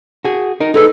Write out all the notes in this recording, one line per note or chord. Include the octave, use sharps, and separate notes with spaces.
F#4 G#4
D#4 A#4
D#4 G#4 A4 B4